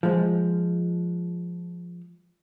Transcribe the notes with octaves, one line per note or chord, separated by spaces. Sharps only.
F3 G#3